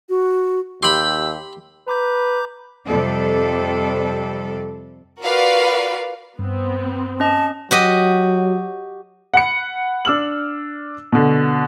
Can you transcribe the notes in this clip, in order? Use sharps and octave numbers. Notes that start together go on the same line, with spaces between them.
F#4
D#2 G4 B5 C6 E6 G6
B4 A#5 D6 G6
F2 C3 G3 A4 D5
F4 F#4 A#4 B4 D5 F5
G2 B3 C4
C#4 D#5 A5
F#3 F#4 G4 D#5
F#5 B5 C#7
D4 E6 F6 F#7
B2 D3